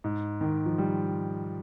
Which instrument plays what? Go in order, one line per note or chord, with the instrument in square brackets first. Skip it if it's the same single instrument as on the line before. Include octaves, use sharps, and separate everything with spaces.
[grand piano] G#2
D#3
F3
G3